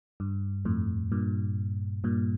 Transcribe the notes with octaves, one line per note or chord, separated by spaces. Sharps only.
G2
F2 A2
G2 A#2
G2 A#2